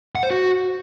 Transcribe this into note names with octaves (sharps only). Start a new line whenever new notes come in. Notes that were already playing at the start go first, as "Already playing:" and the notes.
F#5
C5
F#4